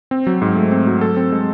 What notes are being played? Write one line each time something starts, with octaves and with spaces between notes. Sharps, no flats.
C4
F#3
G#2
A3
C4
F#3
A4
C4
G#3